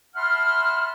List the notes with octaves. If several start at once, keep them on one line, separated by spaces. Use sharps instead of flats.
E5 F#5 A5 B5 C6 F6